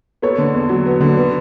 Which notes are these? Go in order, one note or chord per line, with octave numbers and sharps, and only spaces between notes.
B3 A4 C#5
D3
E2
F#3
B3
D3
B3